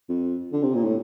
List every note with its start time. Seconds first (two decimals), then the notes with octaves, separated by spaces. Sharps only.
0.09 F2
0.53 D3
0.63 C3
0.75 A#2
0.85 A2